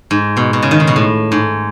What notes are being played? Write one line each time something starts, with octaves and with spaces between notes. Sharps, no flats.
G#2
B2
B2
C#3
D#3
C#3
B2
A2
G#2